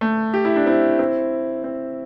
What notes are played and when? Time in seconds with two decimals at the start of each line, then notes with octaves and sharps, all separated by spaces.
0.01 A3
0.34 G4
0.45 E4
0.56 D4
0.66 C4 E4
0.99 C4 E4
1.64 C4